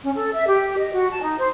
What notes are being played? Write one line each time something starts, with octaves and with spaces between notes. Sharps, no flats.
C#4
A4
E5
G4
D#5
F#4
A5
D#4
C5